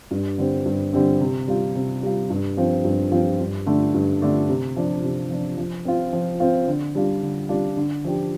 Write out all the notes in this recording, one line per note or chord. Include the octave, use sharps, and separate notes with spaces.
G2
D3 G3 C4
G2
D3 G3 C4
C3
G3 F4
C3
G3 F4
G2
F3 C4 F4
G2
F3 C4 F4
G2
D3 A3 D4
G2
D3 A3 D4
C3
F3 D4
C3
F3 D4
F3
C4 F4
F3
C4 F4
D3
G3 D4 F4
D3
G3 D4 F4
D3
F3 D4 G4